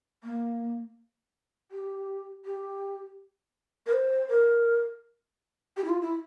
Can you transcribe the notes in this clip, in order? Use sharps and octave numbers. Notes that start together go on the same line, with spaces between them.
A#3
G4
G4
A#4
C5
A#4
G4
E4
F4
E4